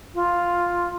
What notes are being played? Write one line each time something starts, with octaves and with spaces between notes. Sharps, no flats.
F4